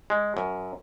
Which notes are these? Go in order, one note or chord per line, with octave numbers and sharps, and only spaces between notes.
G#3
F#2